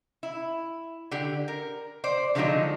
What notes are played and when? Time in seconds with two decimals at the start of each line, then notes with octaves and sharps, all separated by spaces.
0.23 E4
1.11 D3 G4
1.48 A#4
2.04 C5 D5
2.35 D3 F3 F#3 G#3 D4 D#4